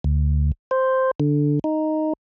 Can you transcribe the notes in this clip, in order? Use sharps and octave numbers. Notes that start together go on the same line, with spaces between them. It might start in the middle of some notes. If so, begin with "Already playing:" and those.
D2
C5
D3
D#4